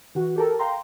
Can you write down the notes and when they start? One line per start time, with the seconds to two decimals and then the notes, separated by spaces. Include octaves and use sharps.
0.15 E3 F#4
0.36 G4 A4 A#4
0.59 F5 G5 A#5 C6